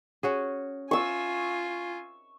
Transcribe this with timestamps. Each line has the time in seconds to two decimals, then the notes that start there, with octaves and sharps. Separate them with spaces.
0.23 C#4 F#4 G#4
0.91 F4 G#5 C#6 E6